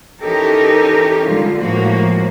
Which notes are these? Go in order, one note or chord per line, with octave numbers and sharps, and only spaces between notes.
E3 C#4 D#4 G4 A4 A#4
D3 G3 G#3 F4
A2 F3 G#3 A#3 F#4